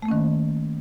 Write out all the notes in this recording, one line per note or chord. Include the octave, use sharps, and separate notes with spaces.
D#3 A3 A#3 C#4